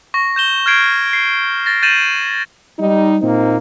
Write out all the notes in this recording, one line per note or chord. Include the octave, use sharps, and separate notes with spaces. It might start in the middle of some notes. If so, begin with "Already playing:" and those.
C#6 A#6
G6 E7 G7
F6 G6 G#6 C7 D7
C7
A6 A#6
G6 A6 D#7 E7 F#7
G3 D#4
A#2 A#3 C4 D#4